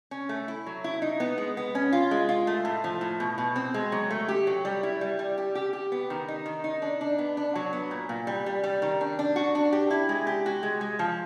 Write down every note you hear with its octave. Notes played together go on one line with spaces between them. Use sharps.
C#4
A3
E4
F#3
E4
D#4
B3
G#3
B3
C#4
F4
G#3
F4
A3
A2
F3
A2
B2
B2
C4
G#3
F#3
A3
G4
F#3
G3
E4
G3
G3
G4
G4
G4
B3
D#3
D#4
D#3
D#4
D4
D4
B3
D4
F#3
B3
A#2
A#2
G3
G3
G3
D#3
D4
D4
F#4
D4
G4
E4
G#3
G4
F#4
G#3
G#3
F3